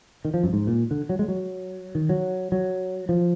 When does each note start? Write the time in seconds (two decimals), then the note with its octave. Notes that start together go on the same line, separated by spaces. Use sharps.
0.25 D#3
0.34 F3
0.44 F#2
0.53 G#2
0.67 A#2
0.91 D3
1.09 F#3
1.19 G#3
1.28 F#3
1.95 D#3
2.09 F#3
2.52 F#3
3.09 F3